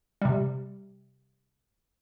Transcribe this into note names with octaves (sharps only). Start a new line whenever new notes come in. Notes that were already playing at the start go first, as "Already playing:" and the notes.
C3 G3